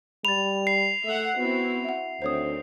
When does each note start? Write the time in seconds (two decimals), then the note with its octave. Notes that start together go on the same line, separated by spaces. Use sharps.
0.25 G3 B5 A6 F7
0.67 C7
1.04 A3 E5 F#5
1.38 B3 C4 E4 F#4
1.84 E5 F#5
2.22 D2 D#3 C4 C5 C#5 D#6